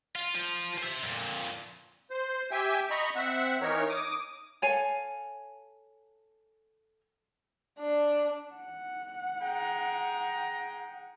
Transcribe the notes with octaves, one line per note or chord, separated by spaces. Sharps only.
F4
F3 F4
C5 E5
F2 A#2
C5
G4 E5 G5 G#5
D#5 A#5 B5 C#6
C4 E5 F#5
E3 D#4 A#4 C#5
D6 D#6
A4 C#5 F5 G#5
D4
F#5
G#4 G5 A#5